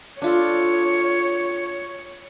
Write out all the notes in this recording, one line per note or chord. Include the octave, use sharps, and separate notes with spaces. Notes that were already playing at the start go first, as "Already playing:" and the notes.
D4 F4 A4 C#5